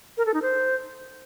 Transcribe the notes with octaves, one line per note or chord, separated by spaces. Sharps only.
A#4
A4
D#4
C5